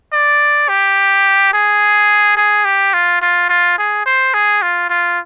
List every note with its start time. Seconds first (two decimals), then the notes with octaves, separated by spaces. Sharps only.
0.13 D5
0.69 G4
1.53 G#4
2.37 G#4
2.65 G4
2.94 F4
3.22 F4
3.49 F4
3.78 G#4
4.06 C5
4.34 G#4
4.62 F4
4.90 F4